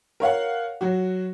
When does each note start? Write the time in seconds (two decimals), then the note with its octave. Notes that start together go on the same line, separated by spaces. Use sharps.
0.20 A#4 C#5 F5 F#5
0.81 F#3 F#4